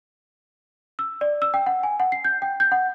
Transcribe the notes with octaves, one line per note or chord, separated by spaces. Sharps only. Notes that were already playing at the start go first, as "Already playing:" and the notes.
E6
D5
E6
G5
F#5
G#5
F#5
C7
G6
G5
G6
F#5